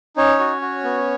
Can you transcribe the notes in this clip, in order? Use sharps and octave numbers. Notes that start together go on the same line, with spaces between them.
C#4 D#4 C#5
F#4
F#4
B3